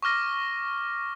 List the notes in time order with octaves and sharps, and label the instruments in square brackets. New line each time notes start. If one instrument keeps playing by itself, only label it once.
[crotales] C#6 D6 F6 A#6